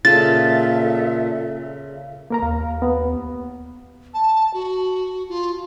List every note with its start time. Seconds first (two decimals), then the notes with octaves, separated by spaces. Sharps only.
0.05 A#2 C#3 F4 A4 E5 A5 A6
2.30 A#3 A#4 A#5
2.42 D#2 F5
2.82 B3
4.14 A5
4.54 F#4
5.29 F4